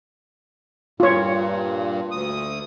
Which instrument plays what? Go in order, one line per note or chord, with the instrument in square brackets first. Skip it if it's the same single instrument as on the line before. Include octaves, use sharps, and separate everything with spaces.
[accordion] G2 A#2 [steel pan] F4 C#5
[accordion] D2 D#6